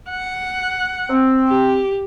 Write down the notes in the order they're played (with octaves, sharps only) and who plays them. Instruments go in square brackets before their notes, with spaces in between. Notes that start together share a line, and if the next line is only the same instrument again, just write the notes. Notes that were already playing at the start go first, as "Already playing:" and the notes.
[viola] F#5
[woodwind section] C4
[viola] G4